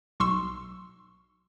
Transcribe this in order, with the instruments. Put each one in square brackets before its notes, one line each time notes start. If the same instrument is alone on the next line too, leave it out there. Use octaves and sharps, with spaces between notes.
[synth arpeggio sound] B1 C6 C#6 E6